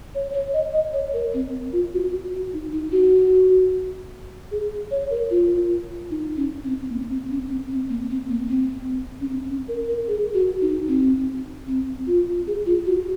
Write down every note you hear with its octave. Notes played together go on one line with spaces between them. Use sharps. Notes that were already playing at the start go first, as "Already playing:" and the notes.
C#5
C#5
D#5
D#5
C#5
A#4
C4
F4
F#4
F#4
D#4
D#4
F#4
G#4
C#5
A#4
F4
D#4
C#4
C4
A#3
C4
C#4
C4
C4
A#3
C4
A#3
C4
C#4
C4
C#4
A#4
A#4
G#4
F#4
D#4
C4
C4
F4
G#4
F4
F#4